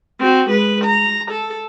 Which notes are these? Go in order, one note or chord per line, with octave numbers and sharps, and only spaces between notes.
C4 F#4
G#3 B4
A#5
A4